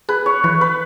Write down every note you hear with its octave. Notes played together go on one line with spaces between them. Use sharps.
G#4 B4
C#5
E3 B4
B4